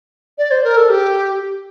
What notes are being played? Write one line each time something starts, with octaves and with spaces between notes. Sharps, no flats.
D5
C5
A#4
A4
G4